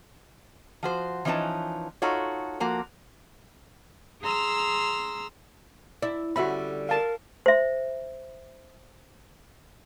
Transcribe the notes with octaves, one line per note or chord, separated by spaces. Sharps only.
F3 F#4 C5
E3 F3 C#4 D#4 B4 A5
D#4 F4 F#4 A4 C#5
F3 A#3 F#4
G#4 A#5 C6 E6 F6
E4 D5
D3 G3 C#4 F#4 E5 B5
A#4 F5 A5
C5 E5